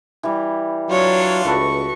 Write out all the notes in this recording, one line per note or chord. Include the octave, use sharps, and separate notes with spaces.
E3 G3
F#3 D4 F4 C#5
C#2 F#4 A4 B4 C#6